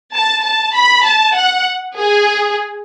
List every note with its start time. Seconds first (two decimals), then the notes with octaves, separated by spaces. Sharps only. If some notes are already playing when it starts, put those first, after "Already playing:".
0.14 A5
0.45 A5
0.76 B5
1.06 A5
1.37 F#5
1.98 G#4